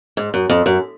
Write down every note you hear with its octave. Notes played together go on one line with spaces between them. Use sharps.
G#2
F#2
F2
F#2